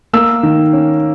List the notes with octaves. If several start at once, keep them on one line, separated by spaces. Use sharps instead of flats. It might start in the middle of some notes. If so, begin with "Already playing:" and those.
A#3 E6
D#3
C#4